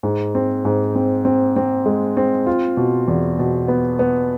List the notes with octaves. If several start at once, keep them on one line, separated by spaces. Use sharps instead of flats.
G#2
C4
G#2
C4
C4
C4
G#3
C4
F4
B2
E2
B2
B3
B3